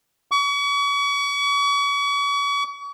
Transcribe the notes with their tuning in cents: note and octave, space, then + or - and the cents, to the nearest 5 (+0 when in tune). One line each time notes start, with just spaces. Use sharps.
C#6 +40